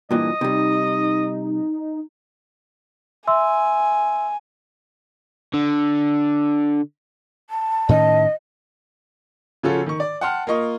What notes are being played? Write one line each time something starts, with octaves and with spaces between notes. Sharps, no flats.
G2 A#2 E3 D#5
C3 G3 D#4
E5 G#5 C6 E6
D3
A5
A2 D#3 C#4 D#5
C#3 F3 C#4 F4 F#4 A4
D#3 C#6
D5
F#5 G5 A5 C6 F6
A#3 F4 D#5 C#6